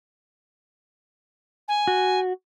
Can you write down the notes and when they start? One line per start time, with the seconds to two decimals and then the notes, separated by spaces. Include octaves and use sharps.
1.68 G#5
1.87 F#4